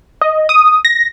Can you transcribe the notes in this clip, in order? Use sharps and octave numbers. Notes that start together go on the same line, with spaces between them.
D#5
D#6
A#6